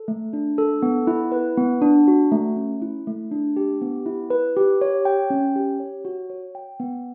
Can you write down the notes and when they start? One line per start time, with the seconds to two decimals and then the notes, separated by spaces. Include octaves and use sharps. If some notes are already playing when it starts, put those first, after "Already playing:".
Already playing: A4
0.08 A3
0.33 D4
0.58 A4
0.82 B3
1.07 E4
1.32 B4
1.57 B3
1.82 D4
2.08 F#4
2.32 A3
2.56 C#4
2.82 E4
3.07 A3
3.31 D4
3.56 G4
3.82 B3
4.06 E4
4.30 B4
4.57 G4
4.81 C#5
5.05 G5
5.30 C#4
5.56 G4
5.80 C#5
6.05 F#4
6.30 C#5
6.55 G5
6.80 B3